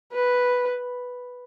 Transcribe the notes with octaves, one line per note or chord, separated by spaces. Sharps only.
B4